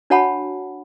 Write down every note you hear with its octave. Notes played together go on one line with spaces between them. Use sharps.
D4 F#4 C#5 F#5 A5 B5